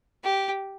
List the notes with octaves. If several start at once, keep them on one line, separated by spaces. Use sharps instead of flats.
G4